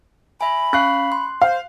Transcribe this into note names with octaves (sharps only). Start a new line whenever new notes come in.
E5 G#5 B5
C#4 F5 C#6 F#6 C7
C6
C5 F5